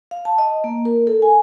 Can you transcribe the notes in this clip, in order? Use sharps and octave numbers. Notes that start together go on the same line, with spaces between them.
F5
A5
D#5
A#3
A#4
A4
G#5